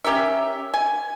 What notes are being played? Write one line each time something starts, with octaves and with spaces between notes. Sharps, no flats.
C#4 G4 A#4 E5
G#5